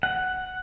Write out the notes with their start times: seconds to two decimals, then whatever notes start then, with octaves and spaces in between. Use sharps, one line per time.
0.03 F#5